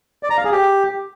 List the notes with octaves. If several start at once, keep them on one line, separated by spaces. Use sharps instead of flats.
D5
A#5
F5
G#4
G4